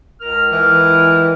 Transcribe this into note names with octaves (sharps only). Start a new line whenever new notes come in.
C#2 A#4 F6
E3